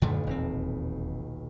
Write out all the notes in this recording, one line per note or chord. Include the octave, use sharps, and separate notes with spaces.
D#1 B1 F#2 D3 A3
E1 C4